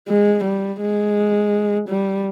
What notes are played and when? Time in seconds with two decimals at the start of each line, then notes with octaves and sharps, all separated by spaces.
0.08 G#3
0.44 G3
0.81 G#3
1.89 G3